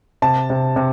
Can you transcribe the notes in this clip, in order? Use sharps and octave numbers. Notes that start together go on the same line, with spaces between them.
C3 A5
C3
C3